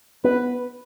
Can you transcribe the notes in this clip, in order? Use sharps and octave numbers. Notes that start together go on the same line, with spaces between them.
B3 B4